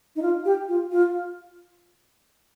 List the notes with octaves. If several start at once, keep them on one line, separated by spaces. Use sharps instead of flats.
D#4
F4
G4
F4
F4